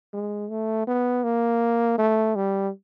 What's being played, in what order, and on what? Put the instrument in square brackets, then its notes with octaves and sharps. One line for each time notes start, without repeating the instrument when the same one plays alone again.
[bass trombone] G#3
A3
B3
A#3
A3
G3